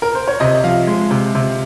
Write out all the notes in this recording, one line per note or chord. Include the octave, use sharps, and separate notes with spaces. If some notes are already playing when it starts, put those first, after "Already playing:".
A#4
C5
C#5
C3 D#5
F3 F5
G#3
C3
C3